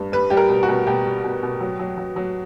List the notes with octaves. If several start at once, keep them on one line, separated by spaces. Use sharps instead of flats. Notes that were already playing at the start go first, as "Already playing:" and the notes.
Already playing: G2
G3 B4
G3 G4
A#4
B2
F#4
B2
B2 G4
G3
B2
B2
F#3
F#3
F#3
F#3